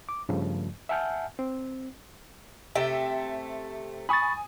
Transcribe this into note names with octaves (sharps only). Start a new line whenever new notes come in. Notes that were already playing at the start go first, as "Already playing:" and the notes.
D6
G2 C#3 F3 A3
E5 F#5 G#5 A5 F6 G6
C4
C3 A3 E5 G5
G#5 B5 C#6 D#6 A6